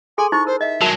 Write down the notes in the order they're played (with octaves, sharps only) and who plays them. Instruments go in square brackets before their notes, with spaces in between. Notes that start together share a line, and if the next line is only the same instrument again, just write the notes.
[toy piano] G#4 A4 C6 [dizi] G#5
[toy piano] D#4 E4 C5 [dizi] C#6
[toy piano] A#4 [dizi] C5
[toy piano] D#5 [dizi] E5
[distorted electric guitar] F#3 G#3 [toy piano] F#4 A#4 A5